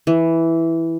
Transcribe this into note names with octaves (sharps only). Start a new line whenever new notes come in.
E3